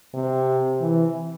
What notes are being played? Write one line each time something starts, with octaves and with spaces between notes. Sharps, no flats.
C3
E3